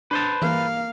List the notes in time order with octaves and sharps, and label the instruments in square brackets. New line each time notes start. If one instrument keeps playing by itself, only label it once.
[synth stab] D4 [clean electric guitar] B4 C5 A5
[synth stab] G2 E3 [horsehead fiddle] A#3 F5